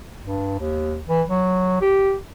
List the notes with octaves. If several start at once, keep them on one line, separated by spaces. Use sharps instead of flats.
G2
D#2
E3
F#3
G4